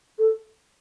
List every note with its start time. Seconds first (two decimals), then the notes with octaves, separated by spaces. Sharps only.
0.18 A4